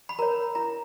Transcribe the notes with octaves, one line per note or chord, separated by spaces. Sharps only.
B5
A#4 C#5 A#5
E4 A#5